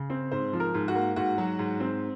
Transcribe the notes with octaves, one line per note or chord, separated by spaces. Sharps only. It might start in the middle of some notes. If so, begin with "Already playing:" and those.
Already playing: C#3
C4
G#2 C5
F3
A#4
G#2
F#4
A#3
G#2 F#4
F#3
G#2
C4